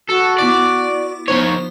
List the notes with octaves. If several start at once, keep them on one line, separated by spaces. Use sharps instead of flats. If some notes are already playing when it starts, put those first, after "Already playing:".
F#4 A4
B3 E4 D5 D6
D#3 F3 B3 C5 C#5